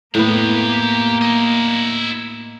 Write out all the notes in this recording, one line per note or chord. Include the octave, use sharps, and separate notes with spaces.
A2 A#3 B3 G4 F5
E4 D#5